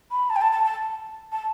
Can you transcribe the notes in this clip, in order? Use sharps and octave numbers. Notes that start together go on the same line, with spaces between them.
B5
A5
G5
A5
A5
A5
A5